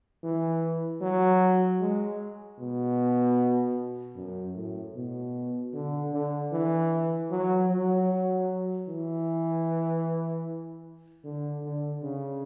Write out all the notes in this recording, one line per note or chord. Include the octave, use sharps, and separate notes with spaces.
E3
F#3
G#3
B2
F#2
A2
B2
D3
D3
E3
F#3
F#3
E3
D3
D3
C#3